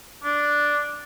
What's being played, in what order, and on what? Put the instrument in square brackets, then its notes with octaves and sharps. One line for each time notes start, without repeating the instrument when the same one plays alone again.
[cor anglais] D4